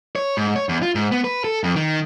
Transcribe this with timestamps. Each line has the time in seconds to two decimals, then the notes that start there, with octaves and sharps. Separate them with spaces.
0.16 C#5
0.37 G#2
0.56 C#5
0.69 E2
0.82 F4
0.95 G#2
1.12 B3
1.24 B4
1.44 A4
1.64 F2
1.76 D#3